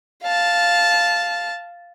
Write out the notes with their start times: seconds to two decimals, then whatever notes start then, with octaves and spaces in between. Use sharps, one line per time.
0.24 F5 A5